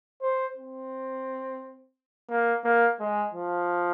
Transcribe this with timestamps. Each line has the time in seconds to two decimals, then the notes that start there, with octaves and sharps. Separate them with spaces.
0.22 C5
0.57 C4
2.29 A#3
2.64 A#3
3.00 G#3
3.33 F3